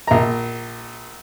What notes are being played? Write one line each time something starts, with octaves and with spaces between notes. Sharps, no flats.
A#1 A#5